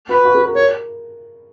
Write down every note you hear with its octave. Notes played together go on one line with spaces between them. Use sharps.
F#4 B4
F#4
G#4
A#4
A#4 C#5